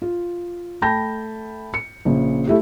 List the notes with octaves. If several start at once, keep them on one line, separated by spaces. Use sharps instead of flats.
F4
A3 G5 A5 B5 G6 A#6
C#7
A#1 C#3
A3 E4 G4